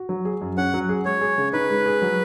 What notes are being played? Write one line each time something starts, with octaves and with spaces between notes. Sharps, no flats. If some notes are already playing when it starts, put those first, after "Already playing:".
Already playing: F#4
F#3
G#4
F#2
C#4 F#5
F#3
G#4
G#3 C#5
G#4
C#3
D#4 B4
G#3
G#4
F#3